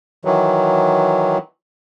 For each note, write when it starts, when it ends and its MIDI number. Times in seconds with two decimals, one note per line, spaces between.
0.25 1.38 51
0.25 1.38 52
0.25 1.38 54